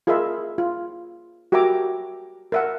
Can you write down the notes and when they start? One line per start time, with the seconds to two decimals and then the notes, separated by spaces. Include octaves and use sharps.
0.07 F4 G#4 A#4 D#5 E5 B5
0.58 F4
1.52 F#4 G4 A#4 E5 A#5 D6
2.52 A#4 E5 F#5